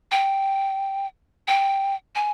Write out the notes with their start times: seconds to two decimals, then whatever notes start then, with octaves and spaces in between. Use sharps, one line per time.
0.11 G5
1.47 G5
2.15 G#5